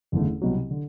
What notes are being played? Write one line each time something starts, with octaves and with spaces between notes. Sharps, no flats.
F#1 E2 D3 A3
C2 B2 F#3
D3